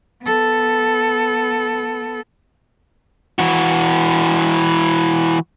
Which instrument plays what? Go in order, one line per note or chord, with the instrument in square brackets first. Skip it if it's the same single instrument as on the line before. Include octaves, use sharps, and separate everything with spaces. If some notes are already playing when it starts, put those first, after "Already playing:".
[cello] B3 A4
[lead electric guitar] E3 F#4